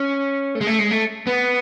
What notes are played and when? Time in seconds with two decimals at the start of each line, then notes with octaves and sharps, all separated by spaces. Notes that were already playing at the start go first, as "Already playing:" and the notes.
Already playing: C#4
0.55 A3
0.61 G#3
0.67 A3
0.79 G#3
0.91 A3
1.27 B3